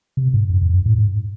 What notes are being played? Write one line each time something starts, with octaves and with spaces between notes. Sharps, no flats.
C3
G#2
F#2
E2
F#2
A2
G#2